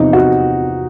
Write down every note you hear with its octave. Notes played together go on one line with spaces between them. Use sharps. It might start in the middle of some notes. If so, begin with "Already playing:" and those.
Already playing: E2 C3 F3 D#4
F#4